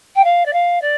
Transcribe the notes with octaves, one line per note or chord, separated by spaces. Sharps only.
G5
F5
D5
F5
D5